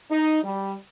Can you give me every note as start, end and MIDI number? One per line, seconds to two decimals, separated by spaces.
0.11 0.41 63
0.43 0.75 55